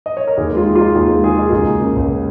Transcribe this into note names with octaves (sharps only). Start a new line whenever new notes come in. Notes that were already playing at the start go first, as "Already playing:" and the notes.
D#5
C#5
A#4
D#2 G#4
G#3 F4
D#3
F4
D#4
D#2 G#4
G#3
D#3 G#4
D#4
F4
C#2 G#4
A#3
C#3
C#2